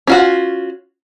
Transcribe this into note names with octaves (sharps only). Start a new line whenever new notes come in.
C#4 F4 F#4